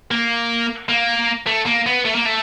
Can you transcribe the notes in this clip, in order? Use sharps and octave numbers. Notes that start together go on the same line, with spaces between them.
A#3
A#3
A3
A#3
B3
A3
A#3
A3